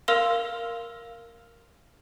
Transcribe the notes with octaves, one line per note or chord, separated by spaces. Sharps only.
A#4 F5 C6 E6 F6 G7